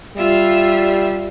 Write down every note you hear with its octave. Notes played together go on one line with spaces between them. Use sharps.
G3 F4 E5